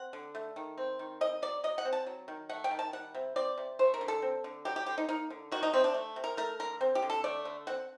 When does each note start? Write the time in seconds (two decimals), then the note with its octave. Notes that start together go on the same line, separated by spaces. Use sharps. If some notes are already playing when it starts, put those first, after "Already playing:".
Already playing: C4 F#5
0.13 D3
0.35 A3
0.56 D#3
0.78 C4
0.99 D#3
1.21 C4 D#5
1.42 F#3 D5
1.64 F#3 D#5
1.78 F#5
1.85 C4
1.93 A5
2.06 F#3
2.28 D#3
2.49 A3 F#5
2.64 G5
2.71 D#3
2.79 A5
2.93 G3 F#5
3.14 C3
3.36 C4 D5
3.58 C3
3.79 A3 C5
3.94 A#4
4.01 D3
4.08 A4
4.22 C4
4.44 D3
4.65 F#3 G4
4.76 G4
4.86 D3 G4
4.98 D#4
5.09 A#3 D#4
5.30 D3
5.52 D#3 F#4
5.63 D#4
5.73 C3 C4
5.84 D4
5.94 A3
6.16 C3
6.24 A#4
6.37 A3 A#4
6.59 D3 A#4
6.81 C4
6.95 G4
7.02 D3
7.10 A4
7.24 A3 D5
7.45 D3
7.67 C4 F#5